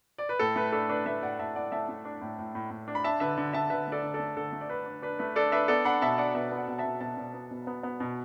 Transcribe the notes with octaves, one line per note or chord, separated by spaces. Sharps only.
D5
B4
A2 A4
A3 B4
D4 A4
D4 B4
A3 B4 E5
A2 D5 F#5
A2 E5 A5
A2 D5 F#5
A3 E5 A5
A3
D4
A2
A2
A2
A2
D4
B5
D4 E5 A5
D3 B4 E5
D3
D3 E5 A5
D3 B4 E5
A3 A4 D5
D3
A4 D5
A3
D3 A4
A3
D5
D4 B4
D4
D4 B4
A3 B4
D4 A4 D5
D4 B4 E5
B3 A4 D5
D4 F#5 B5
B2 E5 A5
D4 D5 F#5
B2 B4 E5
B3
D5 F#5
B2 F#5
E5 A5
B2
B2 E5 A5
B2
B3
B2
B3
B3
B2